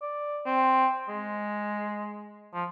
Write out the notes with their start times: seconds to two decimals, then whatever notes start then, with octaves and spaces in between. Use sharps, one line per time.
0.02 D5
0.46 C4
1.09 G#3
2.54 F3